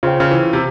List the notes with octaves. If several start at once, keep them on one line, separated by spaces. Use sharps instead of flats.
C#3 F4 C5 G5
C#3
E3
C3